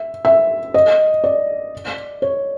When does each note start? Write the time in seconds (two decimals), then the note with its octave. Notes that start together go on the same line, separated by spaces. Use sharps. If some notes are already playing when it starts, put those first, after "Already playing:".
Already playing: E5
0.25 E5
0.74 D#5
1.24 D5
2.22 C#5